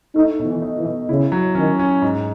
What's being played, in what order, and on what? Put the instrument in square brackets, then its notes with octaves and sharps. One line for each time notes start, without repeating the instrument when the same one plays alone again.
[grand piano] A3 [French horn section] D#4
[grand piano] B2
[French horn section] E3
[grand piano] D#4
[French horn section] E3
[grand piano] B2
[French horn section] C#3 [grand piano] E4
[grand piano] F#3
[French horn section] D#3 [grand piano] C#4
[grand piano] C#4
G#2